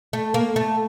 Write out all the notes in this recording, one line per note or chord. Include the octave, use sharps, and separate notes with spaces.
A3
A#3
A3